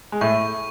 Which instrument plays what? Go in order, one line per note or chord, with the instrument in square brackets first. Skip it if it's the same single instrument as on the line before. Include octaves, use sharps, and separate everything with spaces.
[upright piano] G#3
[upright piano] A2 A3 [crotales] C#6